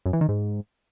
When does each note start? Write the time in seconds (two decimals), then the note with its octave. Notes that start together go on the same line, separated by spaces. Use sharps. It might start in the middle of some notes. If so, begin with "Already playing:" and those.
0.06 F#2
0.13 E3
0.21 D#3
0.29 G#2